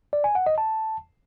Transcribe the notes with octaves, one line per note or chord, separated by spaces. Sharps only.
D5
G#5
F#5
D#5
A5